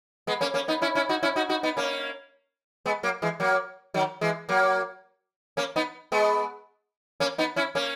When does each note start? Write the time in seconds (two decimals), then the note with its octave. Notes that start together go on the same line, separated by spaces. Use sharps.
0.27 G#3 B3
0.41 A#3 C#4
0.54 A#3 C#4
0.68 B3 D#4
0.82 C#4 E4
0.95 C#4 E4
1.09 D#4 F#4
1.23 C#4 E4
1.36 D#4 F#4
1.49 D#4 F#4
1.63 B3 D#4
1.77 A#3 C#4
2.86 G#3 B3
3.03 F#3 A#3
3.22 E3 G#3
3.40 F#3 A#3
3.94 D#3 F#3
4.21 E3 G#3
4.49 F#3 A#3
5.57 A#3 C#4
5.76 B3 D#4
6.12 G#3 B3
7.20 A#3 C#4
7.38 B3 D#4
7.56 C#4 E4
7.75 A#3 C#4